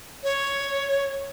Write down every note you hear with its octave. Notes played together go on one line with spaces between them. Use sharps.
C#5